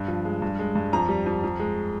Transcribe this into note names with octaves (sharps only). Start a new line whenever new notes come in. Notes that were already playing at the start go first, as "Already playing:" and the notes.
Already playing: G2
F3
G#3
G2
G#3
G2
F2 A#5
G3
F2
F2
G#3